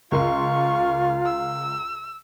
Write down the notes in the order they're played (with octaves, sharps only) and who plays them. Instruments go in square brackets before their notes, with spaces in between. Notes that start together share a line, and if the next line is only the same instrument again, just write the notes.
[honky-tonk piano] C#2 A#4 C6 [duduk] F4 [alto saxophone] F5 [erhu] C#6
[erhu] E6